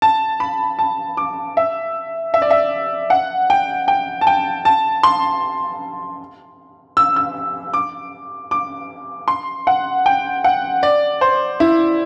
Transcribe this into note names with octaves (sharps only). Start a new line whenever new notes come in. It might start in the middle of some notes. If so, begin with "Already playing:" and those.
A5
B5
A5
D6
E5
E5
D5
E5
F#5
G5
G5
A5
G5
A5
C6
E6
E6
D6
D6
C6
F#5
G5
F#5
D5
C5
E4